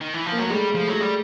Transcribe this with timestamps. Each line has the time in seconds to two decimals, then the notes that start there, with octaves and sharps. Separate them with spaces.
0.01 D#3
0.14 E3
0.26 F3
0.32 A#3
0.38 F#3 A3
0.50 G3 G#3
0.71 F3 A3
0.88 F#3 G#3
1.00 G3